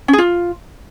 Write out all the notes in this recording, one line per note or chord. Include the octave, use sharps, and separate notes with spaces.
C#4
G#4
F4